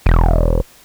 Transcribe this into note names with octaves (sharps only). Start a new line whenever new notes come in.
E1